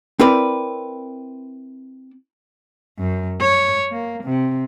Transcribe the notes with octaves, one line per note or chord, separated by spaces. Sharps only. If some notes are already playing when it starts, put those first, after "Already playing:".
C4 E4 A#4 B4 D5
F#2
C#5
A#3
C3